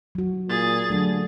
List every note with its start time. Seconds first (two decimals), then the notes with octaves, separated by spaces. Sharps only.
0.15 F#3 F#4
0.49 A#2 G#4 A6
0.90 D3 F#3 A3